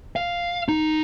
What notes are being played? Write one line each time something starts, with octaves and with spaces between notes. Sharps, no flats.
F5
D#4